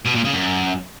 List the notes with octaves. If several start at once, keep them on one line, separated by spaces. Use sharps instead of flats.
B2
A#2
C#3
F#2